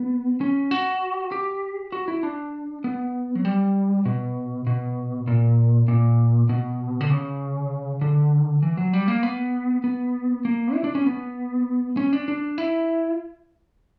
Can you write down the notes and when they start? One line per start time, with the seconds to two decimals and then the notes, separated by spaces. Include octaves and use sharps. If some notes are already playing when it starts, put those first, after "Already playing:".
Already playing: B3
0.41 C#4
0.71 F#4
1.32 G4
1.92 F#4
2.08 E4
2.23 D4
2.84 B3
3.35 F#3
3.45 G3
4.05 B2
4.67 B2
5.27 A#2
5.88 A#2
6.49 B2
7.01 D3
7.10 C#3
8.01 D3
8.63 E3
8.77 F#3
8.93 G3
9.08 A#3
9.23 B3
9.84 B3
10.45 A#3
10.74 E4
10.84 D4
10.95 C#4
11.06 B3
11.97 C#4
12.13 D4
12.28 D4
12.58 E4